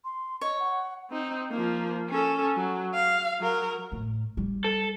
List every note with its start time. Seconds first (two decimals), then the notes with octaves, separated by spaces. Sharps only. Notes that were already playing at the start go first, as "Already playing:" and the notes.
0.04 C6
0.41 C#5 D#5
0.60 F#5
1.10 C4 D#4
1.51 F3 A#3
2.09 C#4 A4
2.57 F#3
2.95 F5
3.40 F#3 A#4
3.92 A2
4.37 G3
4.64 A4